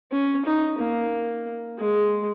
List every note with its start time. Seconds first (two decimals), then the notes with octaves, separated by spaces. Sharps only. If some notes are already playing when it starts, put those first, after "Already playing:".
0.12 C#4
0.45 D#4
0.78 A#3
1.78 G#3